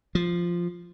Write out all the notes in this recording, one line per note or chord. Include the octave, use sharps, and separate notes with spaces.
F3